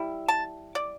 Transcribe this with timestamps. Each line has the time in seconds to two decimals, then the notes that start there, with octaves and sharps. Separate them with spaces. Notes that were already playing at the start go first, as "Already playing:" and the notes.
Already playing: G3 E4
0.28 A5
0.75 D5